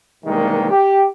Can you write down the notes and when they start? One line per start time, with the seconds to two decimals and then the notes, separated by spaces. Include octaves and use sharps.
0.24 E2 G2 C3 D#3 G#3 A#3
0.69 G4